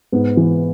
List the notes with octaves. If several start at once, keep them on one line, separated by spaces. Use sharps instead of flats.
G#2 B3
E3